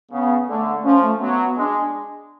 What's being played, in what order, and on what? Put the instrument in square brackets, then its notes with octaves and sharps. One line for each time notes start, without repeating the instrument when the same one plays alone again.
[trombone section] C#3 [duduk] B3
[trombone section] D3 [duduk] A3
[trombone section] F3 [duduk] C#4
[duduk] A3
[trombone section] F#3 [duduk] B3
[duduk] B3
[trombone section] G#3 [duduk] D4